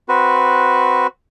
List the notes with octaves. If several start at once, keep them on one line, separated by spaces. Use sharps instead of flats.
C4 F#4 B4